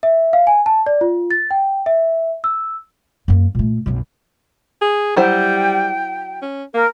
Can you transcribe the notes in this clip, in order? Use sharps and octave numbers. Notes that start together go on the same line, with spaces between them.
E5
F5
G#5
A5
D5
F4
A6
G5
E5
E6
F#2 A#3
A#2 A3
B1 F#2
G#4
F#3 G3 E4 C5 G5
C#4
A#3 A#4